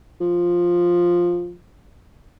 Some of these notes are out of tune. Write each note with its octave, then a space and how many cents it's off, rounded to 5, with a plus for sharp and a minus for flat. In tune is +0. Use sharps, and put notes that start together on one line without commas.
F3 +5